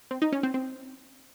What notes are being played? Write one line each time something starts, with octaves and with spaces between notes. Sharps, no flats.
C4
D#4
C#4
C4
C4